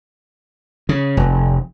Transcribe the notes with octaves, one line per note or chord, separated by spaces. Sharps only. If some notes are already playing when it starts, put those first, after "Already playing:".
C#3
F1